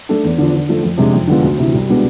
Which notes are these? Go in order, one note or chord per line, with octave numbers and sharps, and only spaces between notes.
A3 D4 A4
E2
D3 F3
D3
F3 A3
F2
C3 G#3 D4
F2
D3 G#3 B3 F4
D2
C3 E3
C2
B2 G#3 B3 D4